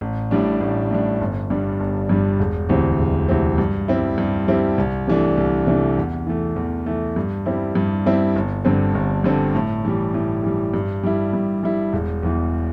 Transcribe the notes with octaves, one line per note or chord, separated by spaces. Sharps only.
A1
A2 G3 D4
A1
A2 G3 D4
G1
G2 G3 D4
G1
G2 G3 D4
E1
D2 C3 E3 C4
E1
D2 C3 E3 C4
G2
G3 C4 E4
G2
G3 C4 E4
C2
C3 E3 A3 D4
C2
C3 E3 A3 D4
E2
E3 A3
E2
E3 A3
G2
G3 C4 E4
G2
G3 C4 E4
G1
G2 D3 C4
G1
G2 D3 C4
A2
E3 G3
A2
E3 G3
G2
G3 E4
G2
G3 E4
E1
E2 E3